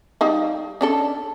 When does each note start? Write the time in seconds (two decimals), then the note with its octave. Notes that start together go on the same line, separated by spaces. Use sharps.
0.21 G3 D#4 F5
0.81 C#4 D4 A4